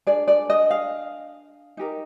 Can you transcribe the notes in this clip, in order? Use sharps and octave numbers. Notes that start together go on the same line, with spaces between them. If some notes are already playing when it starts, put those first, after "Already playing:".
D4 G#4 D5
D5
D#5
F5
D#4 G4 A#4